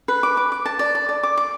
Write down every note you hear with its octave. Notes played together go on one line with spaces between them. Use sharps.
B4
D6
D6
D6
A5
D5
D5
D5
D6
D6